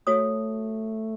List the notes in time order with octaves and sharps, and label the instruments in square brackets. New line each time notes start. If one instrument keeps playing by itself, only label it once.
[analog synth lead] A3 [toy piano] F#4 C#5 D#6